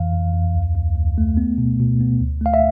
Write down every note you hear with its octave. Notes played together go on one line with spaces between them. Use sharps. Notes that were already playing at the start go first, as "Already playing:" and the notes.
Already playing: F2 E3 F5
F2
F2
D2
D2
D2
A3
B3
B2
B2
B3
D2
A3 F5
E5